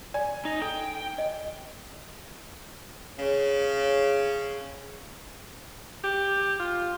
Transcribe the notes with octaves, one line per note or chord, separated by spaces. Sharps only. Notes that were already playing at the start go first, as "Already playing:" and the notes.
D5 G#5
D#4
A4 G5
D#5
C#3
G4
F4